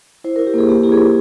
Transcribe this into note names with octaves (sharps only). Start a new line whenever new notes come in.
E4 C5
A#4
E4
G4
A#3 G#4
A#3 G4
E4 G4
G#4
E4